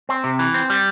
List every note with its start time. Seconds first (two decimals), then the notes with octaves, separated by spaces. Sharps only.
0.09 C4
0.24 C3
0.39 E3
0.54 C4
0.70 G3